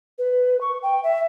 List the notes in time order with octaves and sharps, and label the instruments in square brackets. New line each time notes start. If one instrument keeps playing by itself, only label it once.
[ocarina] B4
C#6
G5
E5